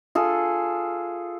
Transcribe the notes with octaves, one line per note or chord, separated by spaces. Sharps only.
F4 G#4 A4